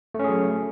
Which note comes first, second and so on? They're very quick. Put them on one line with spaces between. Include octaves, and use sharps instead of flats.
A3 C#4 G#4 F#3